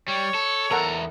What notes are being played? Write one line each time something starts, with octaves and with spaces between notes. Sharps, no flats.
G3 C#5
A4
E2 A4 A#4 F#5 A#5